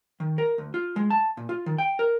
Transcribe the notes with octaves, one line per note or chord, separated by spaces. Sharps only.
D#3
A#4
D2
F4
G#3
A5
A#2
F4
D#3
G5
A#4